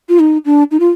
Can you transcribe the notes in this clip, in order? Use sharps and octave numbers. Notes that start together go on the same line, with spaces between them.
F4
D#4
D4
D#4
F4